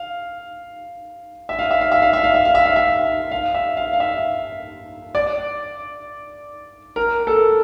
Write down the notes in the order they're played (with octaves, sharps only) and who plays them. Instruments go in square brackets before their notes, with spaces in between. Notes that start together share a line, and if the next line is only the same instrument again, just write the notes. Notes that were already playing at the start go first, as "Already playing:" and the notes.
Already playing: [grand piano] F5
E5
F5
E5
F5
E5
F5
E5
F5
E5
F5
E5
F5
E5
F5
E5
F5
F5
E5
D5
A#4
A4